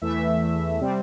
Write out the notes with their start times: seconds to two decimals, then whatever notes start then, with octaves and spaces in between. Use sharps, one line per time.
0.02 E2 E3 A3 E5
0.80 C3 G3 C4